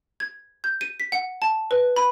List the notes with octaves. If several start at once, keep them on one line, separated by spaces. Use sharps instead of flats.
G#6
G6
D#7
B6
F#5
A5
B4
B5